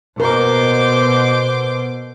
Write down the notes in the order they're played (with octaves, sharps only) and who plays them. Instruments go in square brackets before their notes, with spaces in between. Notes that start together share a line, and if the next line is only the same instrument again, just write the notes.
[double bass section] B2 [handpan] A#4 [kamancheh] C5 D6